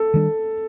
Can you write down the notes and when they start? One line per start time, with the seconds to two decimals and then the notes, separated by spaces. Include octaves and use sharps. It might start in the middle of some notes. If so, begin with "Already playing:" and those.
Already playing: A4
0.14 D#3 G3 D4